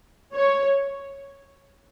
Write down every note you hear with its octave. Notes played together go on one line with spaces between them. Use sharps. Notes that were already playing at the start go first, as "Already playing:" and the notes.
C#5